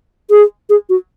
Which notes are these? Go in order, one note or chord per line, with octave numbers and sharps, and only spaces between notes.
G#4
G#4
F#4